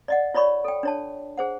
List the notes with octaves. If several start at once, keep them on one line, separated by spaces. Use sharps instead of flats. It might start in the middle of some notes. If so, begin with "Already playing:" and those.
D5 D#5 F#5
F4 C#5 D5 B5 C#6
A4 G5
D4 C#5 A5
G#4 C5 F#5